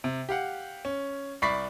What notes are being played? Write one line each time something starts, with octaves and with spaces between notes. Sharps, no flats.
C3
G4 F5 F#5
C#4
C2 D5 B5 C#6 B6 C7